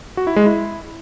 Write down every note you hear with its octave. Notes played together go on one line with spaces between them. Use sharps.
F#4
E4
G#3
E4